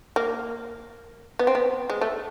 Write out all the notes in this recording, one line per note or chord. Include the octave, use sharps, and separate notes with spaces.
A#3
B3
C4
B3
G#3
A3